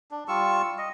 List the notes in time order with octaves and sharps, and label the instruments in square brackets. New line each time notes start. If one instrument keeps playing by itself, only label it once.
[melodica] D4
G3 F4 C#6 E6
D#5